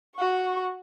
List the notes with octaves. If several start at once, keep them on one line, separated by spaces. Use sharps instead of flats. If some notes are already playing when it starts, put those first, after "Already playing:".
F#4 C#6